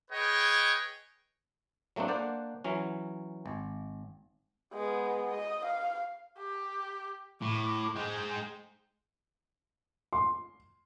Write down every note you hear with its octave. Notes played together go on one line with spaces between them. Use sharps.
G#4 B4 C#5 D#5 G5
F#3 A3 A#3 C4 D4
A#3 D4 C5 D5 F#5
E3 F#3 C#4
G#1
G#3 B3
D#5
F5
G4
A2 D6
G#3 C5 G5
C6